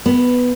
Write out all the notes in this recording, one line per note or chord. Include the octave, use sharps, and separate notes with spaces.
B3